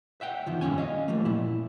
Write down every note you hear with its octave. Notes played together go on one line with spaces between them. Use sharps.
E5 F#5 G5
E2 D#3 F3
G2 A#2 C#4 G#5
D#5 F5
F3 A3 A#3
A#2 E4